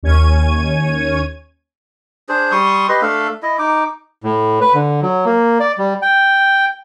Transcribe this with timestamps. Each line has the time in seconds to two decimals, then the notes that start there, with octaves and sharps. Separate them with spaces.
0.03 D#2 C#4 C#5 G#6 D#7
2.29 D4 G#4 C5
2.52 G3 C6 C#6 D#6
2.89 G4 B4 D#5 C6
3.02 A3 D4 A4 F5
3.43 E4 D#5
3.59 D#4 D6
4.24 A2
4.61 B4
4.74 D3
5.03 F#3
5.26 A#3
5.60 D5
5.78 G3
6.02 G5